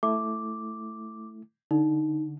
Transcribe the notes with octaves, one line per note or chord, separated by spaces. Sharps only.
A3 E4 D6
D3 D#4